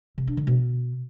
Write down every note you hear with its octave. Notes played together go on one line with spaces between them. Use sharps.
C3
D4
D3
B2